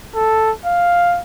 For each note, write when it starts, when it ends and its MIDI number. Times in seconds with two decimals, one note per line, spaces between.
0.15 0.51 69
0.65 1.22 77